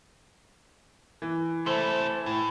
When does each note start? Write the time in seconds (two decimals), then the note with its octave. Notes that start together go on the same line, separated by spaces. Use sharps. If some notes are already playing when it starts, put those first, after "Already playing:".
1.22 E3
1.66 C3 A3 E4 A4 C5
2.26 A2 E4